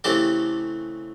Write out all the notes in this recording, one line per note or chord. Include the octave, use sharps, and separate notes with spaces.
C#3 E3 A3 C4 G4 A4